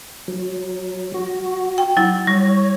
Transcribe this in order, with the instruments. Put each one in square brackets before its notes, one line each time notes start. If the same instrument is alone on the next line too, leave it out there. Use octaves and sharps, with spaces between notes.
[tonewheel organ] F#3
F#4
[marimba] G5
F#3 E4
[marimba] G3 [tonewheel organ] C#5